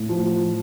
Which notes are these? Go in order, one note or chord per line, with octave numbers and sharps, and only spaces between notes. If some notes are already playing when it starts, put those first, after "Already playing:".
Already playing: A2
F3